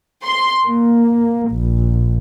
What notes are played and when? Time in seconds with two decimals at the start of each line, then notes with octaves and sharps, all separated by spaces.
0.25 C6
0.65 A#3
1.51 A#1